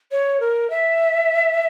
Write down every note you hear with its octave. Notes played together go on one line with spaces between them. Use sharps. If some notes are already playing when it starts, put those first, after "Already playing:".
C#5
A#4
E5